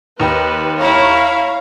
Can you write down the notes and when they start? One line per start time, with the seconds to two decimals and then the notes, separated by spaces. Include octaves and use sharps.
0.20 D#2 D#4 G4 B4
0.81 E4 C#5 F5 A#5